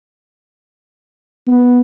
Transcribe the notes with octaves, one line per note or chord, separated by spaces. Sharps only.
B3